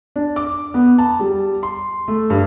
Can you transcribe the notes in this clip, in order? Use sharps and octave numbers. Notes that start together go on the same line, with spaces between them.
D4
D6
B3
A5
G3
C6
A3
G2